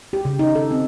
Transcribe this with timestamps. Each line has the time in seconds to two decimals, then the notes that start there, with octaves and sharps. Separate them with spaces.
0.13 G4
0.25 C#3
0.39 D#4
0.55 A4
0.71 C4